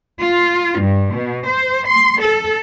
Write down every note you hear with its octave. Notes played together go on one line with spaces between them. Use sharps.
F4
G2
B2
C5
C6
A4